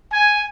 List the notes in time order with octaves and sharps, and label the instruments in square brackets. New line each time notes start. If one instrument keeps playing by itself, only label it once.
[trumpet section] G#5